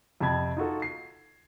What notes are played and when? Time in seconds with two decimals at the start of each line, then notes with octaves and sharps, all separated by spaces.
0.20 F2 C3 A5 B5 G#6
0.57 D#4 F4 F#4 A4
0.82 C7